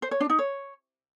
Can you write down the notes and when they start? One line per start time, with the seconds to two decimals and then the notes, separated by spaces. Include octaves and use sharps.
0.02 C5
0.11 C#5
0.20 D4
0.30 D#4
0.39 C#5